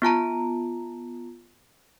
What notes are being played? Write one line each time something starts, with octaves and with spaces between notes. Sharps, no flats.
B3 F4 A5 A#5